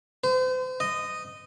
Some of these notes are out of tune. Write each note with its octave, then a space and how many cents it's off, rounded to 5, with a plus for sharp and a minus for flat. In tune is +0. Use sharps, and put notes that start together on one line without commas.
C5 -40
D#5 -10